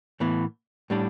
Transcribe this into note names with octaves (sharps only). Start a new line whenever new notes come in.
A2 E3 B3
A2 G3 D4